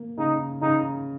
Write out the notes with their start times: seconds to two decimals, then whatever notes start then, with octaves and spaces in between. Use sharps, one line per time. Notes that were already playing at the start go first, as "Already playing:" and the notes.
Already playing: A#3
0.18 C#3 D#4
0.62 C#3 D#4